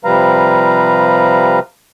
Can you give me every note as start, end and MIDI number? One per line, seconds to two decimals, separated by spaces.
0.05 1.59 48
0.05 1.59 53
0.05 1.59 55
0.05 1.59 71
0.05 1.59 77
0.05 1.59 82